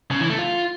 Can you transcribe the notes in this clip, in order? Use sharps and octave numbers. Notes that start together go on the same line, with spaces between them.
C#3
E3
A3
F4